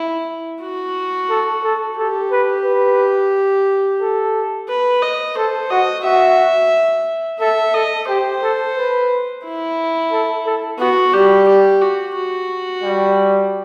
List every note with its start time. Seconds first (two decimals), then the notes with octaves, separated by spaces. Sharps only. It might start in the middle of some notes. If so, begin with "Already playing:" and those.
Already playing: E4
0.62 F#4
1.30 A4
1.64 A4
1.98 G4 A4
2.32 B4
2.65 B4
4.02 A4
4.69 B4
5.02 D#5
5.37 A4 C5
5.70 F#4 D#5
6.05 F#4 E5
7.40 A4 E5
7.74 A4 D#5
8.09 G4 C5
8.43 A4
8.77 B4
9.44 E4
10.12 A4
10.46 A4
10.79 B3 F#4
11.13 G3 G4
11.48 G4
11.82 F#4
12.15 F#4
12.83 G3